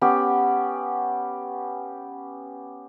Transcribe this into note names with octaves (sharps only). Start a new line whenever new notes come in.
B3 C#4 G4